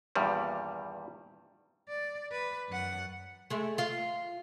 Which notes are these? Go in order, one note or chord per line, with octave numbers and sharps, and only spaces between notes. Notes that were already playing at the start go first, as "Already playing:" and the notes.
E2 G2 A#2 D#3 G3
D5
B4
F#2 F#5
G#3 A3
F4 F5